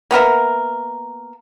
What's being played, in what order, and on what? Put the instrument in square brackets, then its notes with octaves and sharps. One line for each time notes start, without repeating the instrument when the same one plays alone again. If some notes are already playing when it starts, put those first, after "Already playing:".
[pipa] A#3 B3 A#4 E5